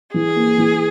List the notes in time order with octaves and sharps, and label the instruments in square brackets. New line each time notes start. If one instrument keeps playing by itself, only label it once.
[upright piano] E3 [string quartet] G#4
[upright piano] A#3
E3